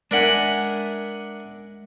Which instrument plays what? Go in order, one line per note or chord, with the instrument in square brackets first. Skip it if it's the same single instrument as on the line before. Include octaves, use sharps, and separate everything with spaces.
[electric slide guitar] G#3 E5 G#5 [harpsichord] D4 A#4 F#5